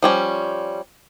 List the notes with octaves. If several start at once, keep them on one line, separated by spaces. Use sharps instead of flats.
F3 G3 C#4